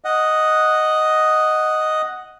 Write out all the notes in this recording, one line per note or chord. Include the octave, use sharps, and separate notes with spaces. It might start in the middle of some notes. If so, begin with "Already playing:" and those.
D#5 F#5